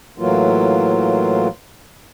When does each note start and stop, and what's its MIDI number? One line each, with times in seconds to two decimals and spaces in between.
0.18 1.48 45
0.18 1.48 52
0.18 1.48 54
0.18 1.48 58
0.18 1.48 65